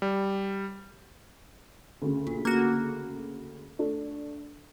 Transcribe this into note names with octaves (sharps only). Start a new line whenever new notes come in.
G3
D2 C#3
A#1
A#3 F#4
A3 D4